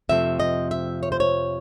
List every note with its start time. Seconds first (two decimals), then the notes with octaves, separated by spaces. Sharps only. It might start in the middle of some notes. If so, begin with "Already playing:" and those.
0.09 F2 C3 F3 A3 E5
0.40 D#5
0.71 E5
1.03 C#5
1.12 C5
1.20 C#5